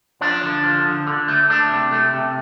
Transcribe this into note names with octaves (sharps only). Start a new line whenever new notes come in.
F3 D4
D3
F3
D3
D3
A3
A3 D4
C3
A3
C3